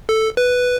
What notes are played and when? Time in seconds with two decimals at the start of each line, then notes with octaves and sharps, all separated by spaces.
0.09 A4
0.37 B4